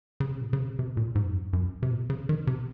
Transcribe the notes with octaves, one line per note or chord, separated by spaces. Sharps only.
C#3
C3
A#2
C#3
C3
C3
A#2
G#2
F#2
F2
F#2
F#2
C3
A#2
C#3
D#3
C3